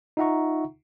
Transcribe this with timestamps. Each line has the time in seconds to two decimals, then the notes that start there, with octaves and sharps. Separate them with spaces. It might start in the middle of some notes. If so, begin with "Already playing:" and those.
0.17 D#4 F4 E5 F#5 A#5 C#6